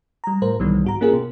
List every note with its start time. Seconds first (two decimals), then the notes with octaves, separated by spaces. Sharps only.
0.24 G3 A#5
0.42 A2 A#4 C5 A#5
0.59 C2 D#3 E3 G3 B3
0.84 G#2 F#4 A#5
1.01 A#3 C#4 F4 G#4 A#4
1.13 B2